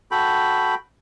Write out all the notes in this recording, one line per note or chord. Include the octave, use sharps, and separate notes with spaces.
F#4 A4 G5 B5